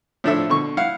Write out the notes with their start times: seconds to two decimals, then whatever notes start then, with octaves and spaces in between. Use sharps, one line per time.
0.24 A2 F3 D4 E4 A4 E5
0.49 B2 D3 C#6
0.77 E4 F5 F#5